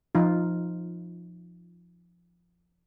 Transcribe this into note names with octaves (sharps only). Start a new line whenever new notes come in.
F3 D#4 F4